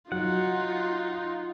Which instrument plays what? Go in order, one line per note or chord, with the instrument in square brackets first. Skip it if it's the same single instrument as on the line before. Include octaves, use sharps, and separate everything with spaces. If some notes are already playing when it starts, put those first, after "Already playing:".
[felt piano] F#3 [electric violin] D#4 F4 [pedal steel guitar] F#5